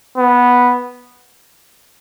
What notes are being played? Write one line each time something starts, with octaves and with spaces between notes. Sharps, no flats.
B3